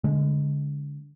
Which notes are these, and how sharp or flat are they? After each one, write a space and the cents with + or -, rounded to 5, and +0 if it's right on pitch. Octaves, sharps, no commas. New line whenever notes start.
D3 -25 G#3 +5